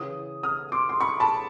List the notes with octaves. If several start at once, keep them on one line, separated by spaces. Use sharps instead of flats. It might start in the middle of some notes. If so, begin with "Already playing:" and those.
Already playing: C#3 E3 D#6
D#6 F6
C6 D6
C6
B5 C#6
A5 B5